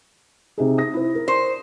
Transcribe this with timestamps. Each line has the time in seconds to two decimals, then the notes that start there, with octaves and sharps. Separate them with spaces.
0.58 C3 D#4 G#4
0.78 D#6 A#6
0.94 E4 C5
1.15 A#4
1.28 C5